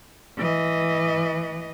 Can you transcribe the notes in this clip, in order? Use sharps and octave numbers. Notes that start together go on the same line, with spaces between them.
E3 D#5